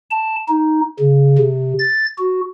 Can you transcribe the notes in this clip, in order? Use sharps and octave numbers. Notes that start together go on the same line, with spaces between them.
A5
D#4
C#3
C3
A6
F#4